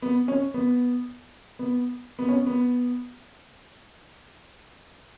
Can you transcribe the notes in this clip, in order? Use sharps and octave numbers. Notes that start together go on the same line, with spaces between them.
B3
C#4
B3
B3
B3
C#4
B3